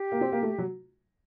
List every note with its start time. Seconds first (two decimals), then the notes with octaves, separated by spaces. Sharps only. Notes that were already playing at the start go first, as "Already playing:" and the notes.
Already playing: G4
0.12 A#3
0.21 C4
0.32 A#3
0.43 A3
0.58 F#3